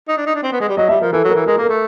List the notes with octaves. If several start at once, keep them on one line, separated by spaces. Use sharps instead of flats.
D#4
D4
D#4
D4
C4
B3
G#3
G3
F#3 D#5
G3 E5
F3 A#4
E3 A4
F#3 A#4
E3
G#3 A#4
A#3 A4
A#4
A3